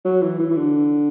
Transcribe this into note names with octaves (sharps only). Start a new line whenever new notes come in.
F#3
E3
E3
E3
D3